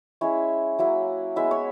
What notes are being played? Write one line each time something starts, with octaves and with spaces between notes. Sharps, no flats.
G#3 C#4 E4 C#5
F#3 A#3 C#4 E4
G#3 B3 E4 E5
C#5